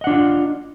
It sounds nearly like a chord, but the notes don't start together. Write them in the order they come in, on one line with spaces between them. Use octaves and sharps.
D#5 F#5 D4 F4